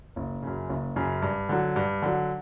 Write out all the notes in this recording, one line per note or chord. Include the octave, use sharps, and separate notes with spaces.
F#1
F#2 C#3
F#1
F#2 C#3
G2
D3 F#3
G2
D3 F#3